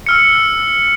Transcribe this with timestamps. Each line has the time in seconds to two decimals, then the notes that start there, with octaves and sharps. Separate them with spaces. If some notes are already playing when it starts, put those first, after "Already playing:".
0.06 E6 F6 C#7